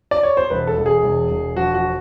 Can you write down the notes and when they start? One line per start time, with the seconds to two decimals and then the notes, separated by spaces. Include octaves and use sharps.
0.11 D5
0.23 C#5
0.37 C5
0.50 E1 B4
0.67 A4
0.77 E1
0.86 G#4
1.03 E1
1.30 E1
1.56 F3 F#4
1.74 F#4